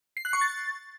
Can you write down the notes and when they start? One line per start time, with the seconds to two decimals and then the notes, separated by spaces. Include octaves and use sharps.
0.17 C7
0.25 F#6
0.33 C#6
0.41 A6